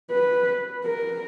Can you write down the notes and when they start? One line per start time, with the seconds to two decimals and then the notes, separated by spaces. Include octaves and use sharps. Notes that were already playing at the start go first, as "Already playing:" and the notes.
0.11 B4
0.85 A#4